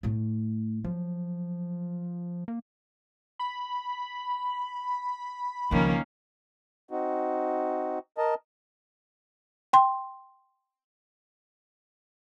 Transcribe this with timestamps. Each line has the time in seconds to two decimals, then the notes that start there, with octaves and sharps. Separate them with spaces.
0.03 A2 A3
0.84 F3 F#3
2.48 A#3
3.39 B5
5.71 C#2 D#3 F3 A#3 C#4
6.91 C4 D#4 F#4
8.18 A#4 D#5 A5
9.73 G5 C6